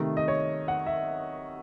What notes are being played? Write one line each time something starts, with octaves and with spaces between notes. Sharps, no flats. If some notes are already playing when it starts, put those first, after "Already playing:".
Already playing: C3 D#3 A3
D#5
C#5
F#5
E5